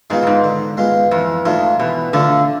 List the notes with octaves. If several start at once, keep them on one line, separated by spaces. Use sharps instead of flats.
G#2 G#3 B3 F4
F2
G#2
D3
G#3 B3 F4
F2 E3
G#2 A3 D4 F4
B2 E3
D3 A3 D4 F4